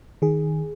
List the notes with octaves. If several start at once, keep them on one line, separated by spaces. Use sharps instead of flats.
D#3 G#4